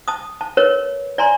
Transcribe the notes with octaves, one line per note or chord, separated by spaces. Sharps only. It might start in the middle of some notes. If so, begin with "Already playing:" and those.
A5 D#6
A5
A#4 B4 C#5
D5 G#5 A#5 C6